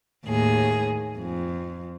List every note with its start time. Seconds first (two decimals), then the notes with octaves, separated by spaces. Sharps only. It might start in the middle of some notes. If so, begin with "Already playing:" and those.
0.24 D#2 A2 G#4
1.18 F2